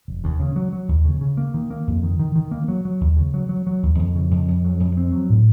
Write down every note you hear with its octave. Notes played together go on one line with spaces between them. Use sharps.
F1
D#2
C#3
F#3
F#3
D#2
C#3
C#3
A#3
D#3
A#3
F2
D#3
D#3
D#3
A#3
F#3
F#3
D#2
C#3
F#3
F#3
F#3
D#2
F2
C#3
F2
F2
F#3
F2
C4
F#3
A2